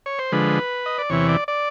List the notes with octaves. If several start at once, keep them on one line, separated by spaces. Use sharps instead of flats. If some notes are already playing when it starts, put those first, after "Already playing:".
C#5
C5
D3 F3 G#3 B4
D#5
D5
E2 C3 E3 C#5
D5
D5